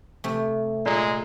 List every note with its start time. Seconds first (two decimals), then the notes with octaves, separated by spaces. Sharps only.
0.24 C3 A3
0.86 A#2 G#3